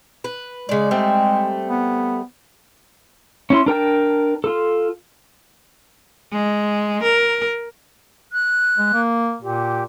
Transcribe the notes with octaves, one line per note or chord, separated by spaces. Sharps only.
B4
C#3 G#3 D5
G3 A3 C4
B3
C#4 E4 C6
D4 A#4 G5 A5
F4 A4
G#3
A#4
F#6
G#3
A#3
A#2 G4